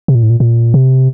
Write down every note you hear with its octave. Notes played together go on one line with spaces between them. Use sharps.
C3
A#2
A2
A#2
A#2
C3